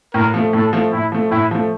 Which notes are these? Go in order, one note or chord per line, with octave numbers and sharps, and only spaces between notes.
A2 A#4
F3 A3
A2 A4
F3 A3
A2 E4
F3 A3
A2 E4
F3 A3